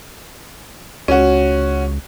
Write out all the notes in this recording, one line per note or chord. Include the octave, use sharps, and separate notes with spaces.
C#2 C#4 F#4